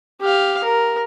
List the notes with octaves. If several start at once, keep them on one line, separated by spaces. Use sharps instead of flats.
G4 F5
A#4